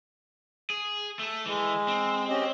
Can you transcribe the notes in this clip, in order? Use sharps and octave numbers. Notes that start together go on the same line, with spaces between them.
G#4
A3 A4
E3 G#3
C4
C#4 G4 D#5